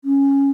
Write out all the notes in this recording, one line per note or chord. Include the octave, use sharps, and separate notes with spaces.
C#4